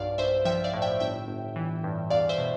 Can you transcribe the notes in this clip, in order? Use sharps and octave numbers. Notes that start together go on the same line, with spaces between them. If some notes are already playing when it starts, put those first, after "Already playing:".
Already playing: B1 G2 D5 F5
B1 C5 E5
F3 E5 G5
D5 F5
A2
E5 G5
G1 E5 G5
G1
E3
G2
E2 D5 F5
C5 E5
B2